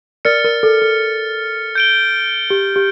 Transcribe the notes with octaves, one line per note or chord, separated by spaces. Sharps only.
A#4 D5 F6 A6 C#7
A#4
A4
A4
G6 D7 G7
G4
G4